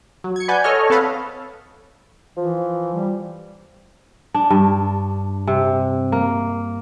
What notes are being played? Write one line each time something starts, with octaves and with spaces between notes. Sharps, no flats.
F#3
G#6 C#7
B4 D5 F#5 G#5 G6
A4 C#5 D#5 F6
C4 A4 B4 F5 F#5
E3 F3
G3
D4
G2
C3
A#3